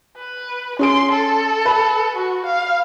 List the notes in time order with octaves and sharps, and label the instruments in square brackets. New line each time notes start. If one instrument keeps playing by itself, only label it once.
[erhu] B4
[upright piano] C#4 G#4 D7 [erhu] C6
[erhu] A4
[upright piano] B4
[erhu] F#4
F5